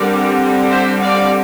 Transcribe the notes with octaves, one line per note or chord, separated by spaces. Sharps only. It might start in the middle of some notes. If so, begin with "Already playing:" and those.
Already playing: D3 G3 C4 A#4 D5
C5 E5
D5 F5